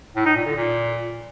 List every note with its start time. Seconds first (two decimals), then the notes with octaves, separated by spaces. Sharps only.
0.16 A2
0.26 D#4
0.36 A#2
0.46 D3
0.55 A#2